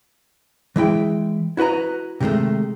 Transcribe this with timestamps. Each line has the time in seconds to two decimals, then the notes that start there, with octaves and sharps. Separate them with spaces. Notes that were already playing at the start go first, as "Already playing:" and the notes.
0.76 E3 G#3 E4 G5
1.57 E4 F#4 B4 D#5 A#5
2.20 C3 D#3 F#3 G#3 A3